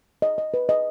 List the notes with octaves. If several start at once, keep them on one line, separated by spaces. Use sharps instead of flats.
D#5
D#5
B4
D#5